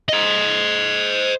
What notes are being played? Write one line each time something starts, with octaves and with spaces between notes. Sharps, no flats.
C5 D#5